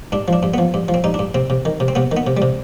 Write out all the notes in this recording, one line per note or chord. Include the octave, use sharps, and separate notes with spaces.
G2 D4
F3 D4
G2
F3 B3
G2
F3
C4
G2 D#4
D4
G2
C3 C4
C3
D#3
C3
C4
C3 B3
D#3
B3
C3
G3
C3